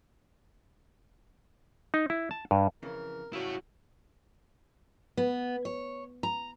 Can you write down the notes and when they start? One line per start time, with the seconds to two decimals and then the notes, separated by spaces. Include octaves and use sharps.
1.94 D#4
2.10 E4
2.31 A5
2.51 G2
2.83 F2 C#3 E3 A#4
3.33 C#3 F#3 G3 E4 F#4 C#5
5.17 B3
5.65 C#5
6.23 A#5